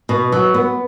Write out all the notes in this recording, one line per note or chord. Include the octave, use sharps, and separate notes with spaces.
B2
F#3
B3